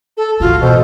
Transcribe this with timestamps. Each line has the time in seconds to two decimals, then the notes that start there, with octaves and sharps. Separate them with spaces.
0.17 A4
0.40 G#2 E3 F4 F#4
0.62 B2 A4 C5